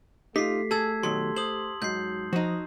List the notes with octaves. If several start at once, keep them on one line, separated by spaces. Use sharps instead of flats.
A3 D#4 F4 G4 B6 C7
G#4 A4 A5 E6 G#6
B2 D#3 F#3 C6
C5 D#6 F#7
G#2 F#3 G6 C7
F3 D#4 F#4